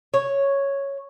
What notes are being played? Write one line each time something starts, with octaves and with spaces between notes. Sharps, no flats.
C#5